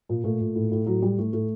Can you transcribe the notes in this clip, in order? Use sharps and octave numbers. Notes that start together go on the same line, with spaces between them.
A#2
A#2 A3
A#2
A2
A2
A2 F#3
A2 G3
A2 A3
A2 A3